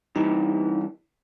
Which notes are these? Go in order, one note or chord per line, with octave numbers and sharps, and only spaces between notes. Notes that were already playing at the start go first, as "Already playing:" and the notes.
G2 E3 D#4